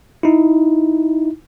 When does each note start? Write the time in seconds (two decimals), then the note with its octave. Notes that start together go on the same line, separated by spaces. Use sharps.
0.23 D#4 E4